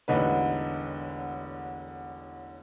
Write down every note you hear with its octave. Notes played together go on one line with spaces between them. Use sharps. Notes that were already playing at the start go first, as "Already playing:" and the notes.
E1 A1 D3 D#4 B4